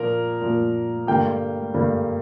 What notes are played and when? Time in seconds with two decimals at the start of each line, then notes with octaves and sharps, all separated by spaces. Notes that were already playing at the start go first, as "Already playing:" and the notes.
Already playing: A#2 F3 A#3 A#4
0.41 A#2 F3 A#3
1.07 G2 D3 G3 A#3 G5
1.74 G2 D3 G3 A#3